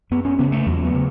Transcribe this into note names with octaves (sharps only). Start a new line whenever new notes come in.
F#2 B3
C#4
C#3 B3
A3
E2 F#3
B3
C#3